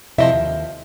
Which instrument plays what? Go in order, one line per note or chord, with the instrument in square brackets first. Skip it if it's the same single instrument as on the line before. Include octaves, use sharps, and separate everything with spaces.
[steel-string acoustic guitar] F2 C3 E4 [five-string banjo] F3 D#5 E5
[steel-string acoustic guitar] D#2